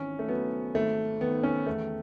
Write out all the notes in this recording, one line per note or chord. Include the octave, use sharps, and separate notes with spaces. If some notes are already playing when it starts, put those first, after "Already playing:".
Already playing: G#1 E3 C#4
A3
F#3 B3
G#1 A3
D#3 B3
C#4
E2 A3